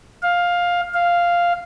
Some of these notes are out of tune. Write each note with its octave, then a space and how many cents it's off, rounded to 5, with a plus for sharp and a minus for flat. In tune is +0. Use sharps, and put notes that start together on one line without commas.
F5 +10
F5 -5